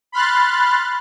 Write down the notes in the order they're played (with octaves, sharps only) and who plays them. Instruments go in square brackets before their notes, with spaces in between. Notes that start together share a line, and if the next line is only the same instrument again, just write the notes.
[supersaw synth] B5 C6 F6 F#6 A6